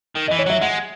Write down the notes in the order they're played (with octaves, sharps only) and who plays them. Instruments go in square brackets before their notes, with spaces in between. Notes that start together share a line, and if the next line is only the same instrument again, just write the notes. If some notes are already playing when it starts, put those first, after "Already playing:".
[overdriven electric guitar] D#3
[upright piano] D#5
[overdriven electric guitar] E3
[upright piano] C#5
[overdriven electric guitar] F#3 [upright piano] E5
[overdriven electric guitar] G#3 [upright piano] F#5